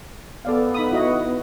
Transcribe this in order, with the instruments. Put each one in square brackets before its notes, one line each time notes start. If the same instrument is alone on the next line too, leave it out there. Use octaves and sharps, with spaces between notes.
[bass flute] B3 [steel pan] A4 D5 F5
[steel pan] D#4 B5 D#6
E4 F#4 D#5